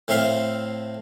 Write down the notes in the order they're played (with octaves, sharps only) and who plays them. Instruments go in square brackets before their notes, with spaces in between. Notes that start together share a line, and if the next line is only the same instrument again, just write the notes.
[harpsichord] A2 A3 C4 E5 F5 C6